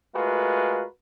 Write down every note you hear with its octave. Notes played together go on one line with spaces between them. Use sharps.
G#3 A3 F4 F#4 A#4 B4